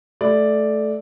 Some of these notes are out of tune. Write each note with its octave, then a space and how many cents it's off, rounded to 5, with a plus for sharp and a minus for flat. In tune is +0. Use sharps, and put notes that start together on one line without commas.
A3 -15 D5 +0